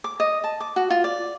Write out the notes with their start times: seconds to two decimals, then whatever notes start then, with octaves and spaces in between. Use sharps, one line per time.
0.04 D6
0.20 D#5
0.44 A5
0.60 D6
0.76 F#4
0.90 F4
1.04 D5